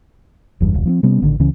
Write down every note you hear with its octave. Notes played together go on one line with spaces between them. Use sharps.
F#1 E2 G2
E1 C#2
F3 B3 C4
C3 G3 B3 C#4
A1 B2 D3 D#3
C#2 C#3 E3 C#4